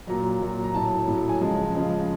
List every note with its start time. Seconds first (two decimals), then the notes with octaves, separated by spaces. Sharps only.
0.07 A#2 F#3 A#5
0.42 A#2 F#3
0.64 A#5
0.75 A2 F#3 A5
1.07 A2 F#3
1.29 G#5
1.41 C#3 F3 G#3 A5
1.75 C#3 F3 G#3